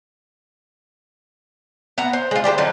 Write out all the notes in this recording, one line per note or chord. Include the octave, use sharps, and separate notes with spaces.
B3 F#5 A#5
C5
G#3 F4
D4 G4 A#4 C5
D3 F3 F#3 D#4